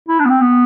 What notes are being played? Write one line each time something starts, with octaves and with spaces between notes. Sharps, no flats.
E4
D4
B3
C4
B3